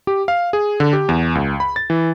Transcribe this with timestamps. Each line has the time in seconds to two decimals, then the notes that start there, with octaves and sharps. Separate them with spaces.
0.07 G4
0.28 F5
0.53 G#4
0.80 D3
0.93 G4
1.09 E2
1.35 C#2
1.60 B5
1.76 A6
1.90 E3